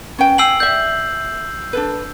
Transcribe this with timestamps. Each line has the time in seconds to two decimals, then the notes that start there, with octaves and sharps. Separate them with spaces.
0.19 C#4 B4 G5
0.38 F5 G5 G#5 E6 C7 F#7
0.60 D5 E5 G6
1.73 D4 A4 B4